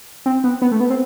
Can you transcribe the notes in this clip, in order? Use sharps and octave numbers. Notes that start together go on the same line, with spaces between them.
C4
B3
B3
A3
B3
C4